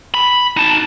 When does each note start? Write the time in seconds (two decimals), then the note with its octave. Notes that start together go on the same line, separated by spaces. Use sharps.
0.14 B5
0.57 D#4 A5